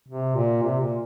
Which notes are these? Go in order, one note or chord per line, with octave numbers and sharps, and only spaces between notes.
C3
A#2
C3
A#2